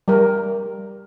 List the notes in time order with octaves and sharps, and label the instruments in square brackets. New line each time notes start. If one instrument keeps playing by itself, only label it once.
[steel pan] G3 A#4